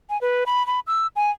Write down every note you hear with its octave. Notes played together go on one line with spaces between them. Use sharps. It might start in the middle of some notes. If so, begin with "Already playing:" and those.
G#5
B4
B5
B5
E6
G#5